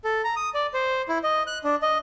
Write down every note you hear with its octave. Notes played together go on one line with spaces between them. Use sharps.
A4
A#5
D#6
D5
C5
E4
D#5
F#6
D4
D#5